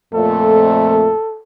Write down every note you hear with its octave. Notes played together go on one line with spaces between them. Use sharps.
F2 A#2 A3 A4